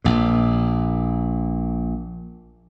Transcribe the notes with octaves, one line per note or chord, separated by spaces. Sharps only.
A#1 A#2